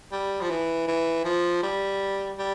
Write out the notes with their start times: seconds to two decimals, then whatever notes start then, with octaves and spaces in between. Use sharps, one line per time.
0.12 G3
0.41 F3
0.50 E3
0.88 E3
1.25 F3
1.63 G3
2.38 G3